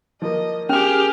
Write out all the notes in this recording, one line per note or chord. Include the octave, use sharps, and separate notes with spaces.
F3 A#3 D#5
C#4 G4 G#4 F6